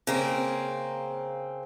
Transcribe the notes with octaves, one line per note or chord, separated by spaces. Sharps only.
C#3 A#3 C4